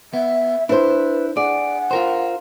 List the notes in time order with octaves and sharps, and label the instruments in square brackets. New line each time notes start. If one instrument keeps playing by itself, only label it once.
[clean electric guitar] B3 [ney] E5
[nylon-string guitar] D4 C5 [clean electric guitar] E4 [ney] B4
[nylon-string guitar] G#4 [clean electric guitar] D5 [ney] F#5
[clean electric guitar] F4 A#4 C5